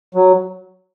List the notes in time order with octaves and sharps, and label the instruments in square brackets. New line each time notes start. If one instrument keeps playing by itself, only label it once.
[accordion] F#3